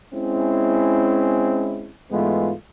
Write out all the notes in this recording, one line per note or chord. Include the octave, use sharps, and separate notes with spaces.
G#3 C4 C#4 E4
G#2 E3 G#3 A3 B3 F4